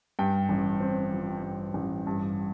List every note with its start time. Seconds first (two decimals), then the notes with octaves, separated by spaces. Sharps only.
0.19 G2 G5
0.49 A1
0.80 C4
1.13 F3
1.43 G2
1.74 A1
2.07 G2